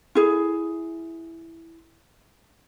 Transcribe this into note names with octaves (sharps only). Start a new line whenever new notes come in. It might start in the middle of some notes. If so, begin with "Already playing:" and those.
E4 G#4